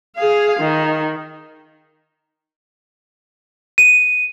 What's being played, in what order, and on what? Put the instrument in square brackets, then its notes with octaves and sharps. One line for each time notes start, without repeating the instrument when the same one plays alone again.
[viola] G#4 F5
D#3
[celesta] D#7